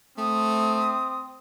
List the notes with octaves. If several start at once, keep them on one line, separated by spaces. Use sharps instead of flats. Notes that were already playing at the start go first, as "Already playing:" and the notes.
A3 C4 D#6